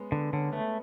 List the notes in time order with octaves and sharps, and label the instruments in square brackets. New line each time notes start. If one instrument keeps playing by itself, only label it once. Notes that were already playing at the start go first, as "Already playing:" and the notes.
Already playing: [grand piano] G#3 B3 C#4
[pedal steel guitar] D3 [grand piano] B3
[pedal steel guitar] D3 [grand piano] C#4
[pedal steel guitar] A3 [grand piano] B3